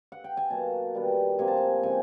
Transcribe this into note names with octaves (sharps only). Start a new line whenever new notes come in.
F#5
G5
G#5
B2 F#3 A#3 A5
D#3 G3 B3 D4
C3 F3 A#3 G#5
A5
G#5
C#3 F3 G#3 C4 G#5